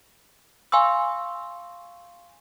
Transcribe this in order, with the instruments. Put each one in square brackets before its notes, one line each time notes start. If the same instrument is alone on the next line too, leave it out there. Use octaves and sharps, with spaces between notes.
[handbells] F5 G#5 C6 C#6 E6